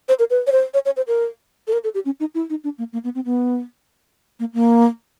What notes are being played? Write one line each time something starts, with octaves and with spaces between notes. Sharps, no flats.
C5
A#4
B4
C#5
C5
C#5
C#5
C5
A#4
A4
A#4
A4
G4
C#4
D#4
E4
D#4
D4
A#3
A#3
B3
C4
B3
A#3
A#3